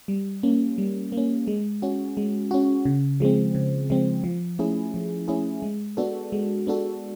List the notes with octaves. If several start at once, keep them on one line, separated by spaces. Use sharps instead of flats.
G3
A#3 C#4
G3
A#3
C#4
G#3
C#4 F#4
G#3
C#4 F#4
C#3
F3 G#3 C4
C#3
F3 G#3 C4
F3
A3 C#4 E4 G#4
F3
A3 C#4 E4 G#4
G#3
B3 D4 F#4 A4
G#3
B3 D4 F#4 A4